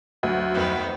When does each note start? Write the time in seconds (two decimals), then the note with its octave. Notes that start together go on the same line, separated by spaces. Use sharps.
0.23 D2 F#3
0.55 F2 D#3 B3